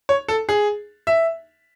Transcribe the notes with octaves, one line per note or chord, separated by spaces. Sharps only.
C#5
A4
G#4
E5